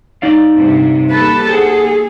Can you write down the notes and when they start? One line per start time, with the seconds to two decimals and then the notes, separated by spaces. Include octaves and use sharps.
0.22 D#4 D5 F5
0.55 G2 C3
1.10 D#2 G4 A4 B4 A5
1.49 G#4 C5 F#5